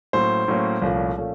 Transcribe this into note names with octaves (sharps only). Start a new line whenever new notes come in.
A2 F#3 A#3 C#4 C5
A2 F#3 A#3 C#4
C2 A#2 F3 A3 C#4
A#2 F3 A3 C#4